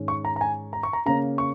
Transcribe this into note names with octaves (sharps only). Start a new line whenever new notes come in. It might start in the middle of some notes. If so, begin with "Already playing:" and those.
Already playing: G#2 D#3 G#3 C#4
C#6
A#5
A#5
G#5
A#5
C#6
A#5
C#3 A#3 C#4 A#5
C#6